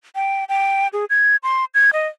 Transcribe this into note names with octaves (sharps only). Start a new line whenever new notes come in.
G5
G5
G#4
G#6
C6
G#6
D#5